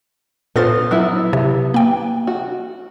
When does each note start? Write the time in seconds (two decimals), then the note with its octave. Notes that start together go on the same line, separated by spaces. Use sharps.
0.56 A#2 B3 F4 A4 C5 A6
0.91 F#3 B3 E4
1.33 C3
1.74 A#3 G5
2.27 F#4